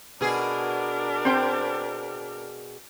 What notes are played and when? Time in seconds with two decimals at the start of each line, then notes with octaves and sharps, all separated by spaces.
0.21 B2 D4 G#4 A#4
1.25 C4 C5 G5